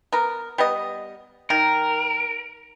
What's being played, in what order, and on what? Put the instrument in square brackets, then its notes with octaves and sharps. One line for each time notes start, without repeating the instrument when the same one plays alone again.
[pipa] B3 A#4
G3 B3 D#5
[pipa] D#3 [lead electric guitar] A#4